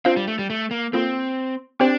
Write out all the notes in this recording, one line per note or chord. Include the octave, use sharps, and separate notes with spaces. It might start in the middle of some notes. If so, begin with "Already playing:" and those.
C4 D4 F4 C5 F5
G3
A3
G3
A3
A#3
A#3 C4 F4 A4
C4 D4 G4 C5 G5